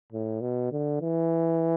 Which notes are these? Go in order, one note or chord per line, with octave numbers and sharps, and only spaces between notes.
A2
B2
D3
E3